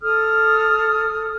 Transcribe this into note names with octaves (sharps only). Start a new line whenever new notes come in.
A4 D#6 F6